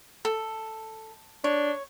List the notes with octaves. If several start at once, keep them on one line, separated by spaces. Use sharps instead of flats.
A4
D4 C#5